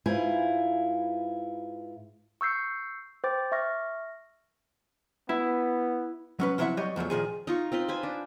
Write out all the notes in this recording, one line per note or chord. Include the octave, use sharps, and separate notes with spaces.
G#2 E4 F4 B4 G#5
C#6 E6 G6 C7 C#7
C5 G5 D6 A6
E5 C#6 F6 A#6
B3 E4
F#3 C#4 B4
F3 F#3 C4 E4 E5 F#5
F#3 G3 G4 C#5 D#5
E2 F3 F#3 A3
A#2 D#3 F3 G#4
D#4 F4 C#6
C4 F4 B4 C6
B4 C5 G#5
D4